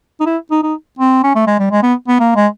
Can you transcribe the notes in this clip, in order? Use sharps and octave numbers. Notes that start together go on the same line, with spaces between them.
D#4
E4
D#4
D#4
C4
C#4
A3
G#3
G3
G#3
B3
B3
A#3
G#3